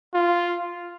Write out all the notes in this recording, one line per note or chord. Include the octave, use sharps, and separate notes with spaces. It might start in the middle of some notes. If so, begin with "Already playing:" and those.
F4